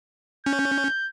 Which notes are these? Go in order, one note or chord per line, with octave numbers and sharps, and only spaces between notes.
C#4 G6